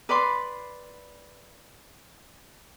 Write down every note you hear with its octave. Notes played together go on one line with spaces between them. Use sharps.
B4 D5 B5 C6